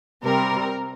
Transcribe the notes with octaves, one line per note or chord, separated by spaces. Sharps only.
C3 G3 C4 A#4